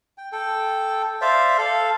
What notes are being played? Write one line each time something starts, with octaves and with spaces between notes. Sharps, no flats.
G5
A4 G5
C5 D5 E5 F5
A4 F5